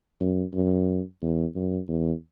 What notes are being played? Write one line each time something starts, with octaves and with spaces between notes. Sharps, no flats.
F#2
F#2
E2
F#2
E2